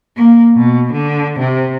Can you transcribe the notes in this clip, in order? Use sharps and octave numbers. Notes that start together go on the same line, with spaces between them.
A#3
B2
D3
C3